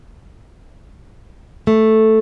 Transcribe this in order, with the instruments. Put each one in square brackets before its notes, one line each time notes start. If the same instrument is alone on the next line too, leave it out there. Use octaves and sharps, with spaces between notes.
[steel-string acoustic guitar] A3